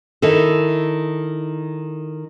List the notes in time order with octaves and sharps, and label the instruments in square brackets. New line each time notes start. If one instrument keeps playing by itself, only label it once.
[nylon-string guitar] D#3 E4 A4